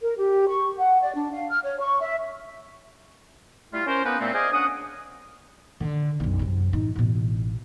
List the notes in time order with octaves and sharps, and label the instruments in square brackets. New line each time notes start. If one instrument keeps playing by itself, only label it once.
[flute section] A#4
G4
C#6
F#5
D5
D4
F5
F6
C#5
C#6
E5
[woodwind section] G3 A3 E4 F4
C#4 A#4 C5
A#3 B3 C#4 D#4 G4 B4
A#2 A3 B3 C4
G#4 C5 D5 D#5 F5 G#5
C#4 D4 F#5 D#6
[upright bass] D3
B1 F#2
F#2 C3
A1 D#4
A1 B2